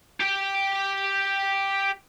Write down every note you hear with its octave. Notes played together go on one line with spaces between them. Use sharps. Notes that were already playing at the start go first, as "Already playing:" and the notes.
G4 G5